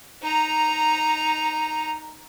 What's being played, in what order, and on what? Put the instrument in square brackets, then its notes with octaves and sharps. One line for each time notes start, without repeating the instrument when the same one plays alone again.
[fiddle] D#4 A#5